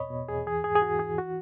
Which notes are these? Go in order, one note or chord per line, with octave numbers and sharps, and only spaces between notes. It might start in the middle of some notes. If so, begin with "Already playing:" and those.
Already playing: E2 B2 C#5 D#5 B5
B2
E2 G#4
E3 G#4
G#2 G#4
G#4
E3 F#4
E3 G#4
F#4